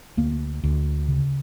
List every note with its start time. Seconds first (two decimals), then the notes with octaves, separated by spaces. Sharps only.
0.17 D2 A#3
0.64 D2
1.09 C#3